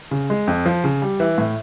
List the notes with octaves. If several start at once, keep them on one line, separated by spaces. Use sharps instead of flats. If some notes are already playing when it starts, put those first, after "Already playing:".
C#3
G#3
F2
F3
C#3
G3
E3
A2